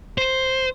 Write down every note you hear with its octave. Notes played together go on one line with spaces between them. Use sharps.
C5